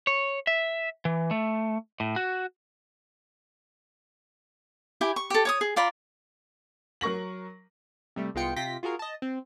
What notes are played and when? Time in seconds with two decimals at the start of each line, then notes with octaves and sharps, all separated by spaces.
0.07 C#5
0.47 E5
1.05 E3
1.31 A3
2.00 A2
2.16 F#4
5.01 E4 G4 G#5
5.16 C#6
5.30 G4 A4
5.45 C#5 D6 D#6
5.61 G#4
5.76 F4 D5 A#5 B5
7.01 F#3 A#4 C#6 A#6 F#7
8.16 C3 G3 A3
8.35 C2 G#3 B3 F4 G5 C#7
8.56 C3 F4 G5 A#6 B6
8.83 F4 F#4 G#4 A#4
8.99 D#5 A5
9.22 C4